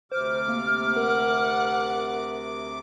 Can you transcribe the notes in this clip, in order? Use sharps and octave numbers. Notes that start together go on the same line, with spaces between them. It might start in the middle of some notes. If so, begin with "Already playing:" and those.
D2 C3 C5 D6 F6
A#3
A#4 F#5